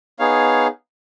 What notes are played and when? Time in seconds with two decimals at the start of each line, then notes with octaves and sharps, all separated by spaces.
0.19 B3 D#4 G#4 C#5 F5